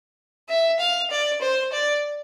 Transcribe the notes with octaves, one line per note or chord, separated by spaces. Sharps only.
E5
F5
D5
C5
D5